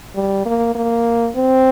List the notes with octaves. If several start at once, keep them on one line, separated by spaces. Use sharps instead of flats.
G3
A#3
A#3
C4